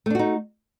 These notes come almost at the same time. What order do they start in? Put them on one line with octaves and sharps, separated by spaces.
A3 D4 F#4 D#4